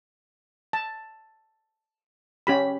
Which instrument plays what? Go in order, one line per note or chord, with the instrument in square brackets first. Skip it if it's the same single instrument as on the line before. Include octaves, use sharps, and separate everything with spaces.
[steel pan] A5
C#4 G4 B5